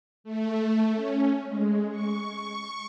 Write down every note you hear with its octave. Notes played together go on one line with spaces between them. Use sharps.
A3
C#4
G#3
C#6